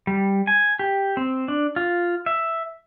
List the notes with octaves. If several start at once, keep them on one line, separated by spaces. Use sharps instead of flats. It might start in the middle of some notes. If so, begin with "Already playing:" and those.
G3
G#5
G4
C4
D4
F4
E5